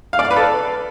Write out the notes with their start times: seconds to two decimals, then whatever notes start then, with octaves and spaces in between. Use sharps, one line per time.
0.13 F5
0.19 D5
0.25 F5
0.31 B4
0.36 A4